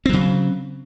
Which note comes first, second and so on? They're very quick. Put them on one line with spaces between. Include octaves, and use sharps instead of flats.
C4 F#3 C#3